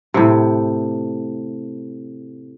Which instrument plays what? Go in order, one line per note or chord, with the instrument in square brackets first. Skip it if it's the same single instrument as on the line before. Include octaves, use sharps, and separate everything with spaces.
[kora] A2 C3